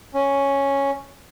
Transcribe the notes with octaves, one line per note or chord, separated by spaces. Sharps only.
C#4